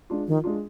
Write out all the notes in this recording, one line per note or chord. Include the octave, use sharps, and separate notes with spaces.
G#3 D4 F4
D#3 F3
G#3 D4 F4